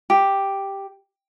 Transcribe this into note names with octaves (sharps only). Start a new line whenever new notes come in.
G4